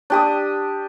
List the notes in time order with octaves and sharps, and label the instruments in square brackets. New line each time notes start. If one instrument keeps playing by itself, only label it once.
[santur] D4 G4 D#6